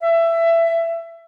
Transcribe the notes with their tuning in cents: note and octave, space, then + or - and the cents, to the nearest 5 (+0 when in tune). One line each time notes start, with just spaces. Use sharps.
E5 +20